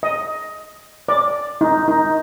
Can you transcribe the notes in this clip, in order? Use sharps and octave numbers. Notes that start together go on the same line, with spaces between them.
D#5
D5
D#4
D#4